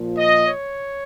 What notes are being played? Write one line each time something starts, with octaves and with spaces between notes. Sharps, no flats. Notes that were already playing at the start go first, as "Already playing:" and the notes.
Already playing: A#2 F3
D#5
C#5